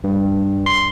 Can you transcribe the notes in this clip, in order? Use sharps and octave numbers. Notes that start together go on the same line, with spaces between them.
G2
C6